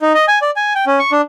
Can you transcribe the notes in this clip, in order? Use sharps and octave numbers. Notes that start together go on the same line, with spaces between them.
D#4
D#5
G#5
D5
G#5
G5
C#4
C#6
D4